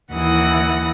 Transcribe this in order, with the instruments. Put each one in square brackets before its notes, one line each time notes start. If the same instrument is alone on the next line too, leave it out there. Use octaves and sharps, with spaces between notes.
[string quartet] D#2 E3 E4 F#5 D#6 A#6